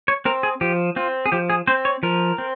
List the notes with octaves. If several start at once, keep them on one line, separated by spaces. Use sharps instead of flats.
C#5
C4 A#4
G#4
F3 G4
C4 F4
G#4
F3 G4
G#4
C4 C5
C#5
F3 A#4
C4